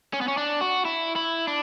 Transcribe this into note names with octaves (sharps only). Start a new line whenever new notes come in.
C#4
B3
C#4
D4
F#4
E4
E4
D4